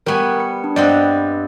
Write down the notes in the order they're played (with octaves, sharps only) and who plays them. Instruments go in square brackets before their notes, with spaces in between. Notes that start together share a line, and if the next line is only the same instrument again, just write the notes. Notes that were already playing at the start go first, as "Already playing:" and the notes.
[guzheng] G3 B3 G#5 [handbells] A#4 C#6
[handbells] C#7
D4
[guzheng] G2 B3 C4 [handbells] D5 D#5